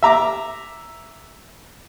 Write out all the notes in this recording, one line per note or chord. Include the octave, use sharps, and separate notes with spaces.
E5 A#5 D6